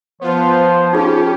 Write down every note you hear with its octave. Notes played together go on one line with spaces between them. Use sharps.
F3 B3 F4 C5
C#4 D#4 F4 G4 G#4